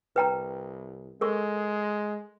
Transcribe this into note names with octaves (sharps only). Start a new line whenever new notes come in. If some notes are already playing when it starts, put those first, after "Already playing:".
C2 B4 G5 A#5
G#3 A4 A#4 C#6